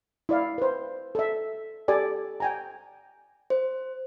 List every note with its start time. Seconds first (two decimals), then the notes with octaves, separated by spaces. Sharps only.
0.29 E4 D5 F5
0.58 B4 C5
1.15 A4 E5
1.88 G4 A4 D5 G#5
2.40 G5 G#5 A#5
3.50 C5